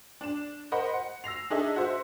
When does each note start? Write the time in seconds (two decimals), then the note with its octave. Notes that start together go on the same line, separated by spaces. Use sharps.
0.21 D4 E7
0.72 A#4 C5 D#5 F#5 B5
0.94 F#5
1.24 E6 A#6 C7 F7
1.50 D4 D#4 G#4 A4 D#5 E5
1.76 F#4 C5 E5